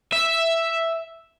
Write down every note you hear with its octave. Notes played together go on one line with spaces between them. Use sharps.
E5